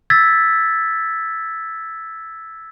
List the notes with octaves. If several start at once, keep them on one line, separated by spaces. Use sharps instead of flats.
E6 G#6 A6 B6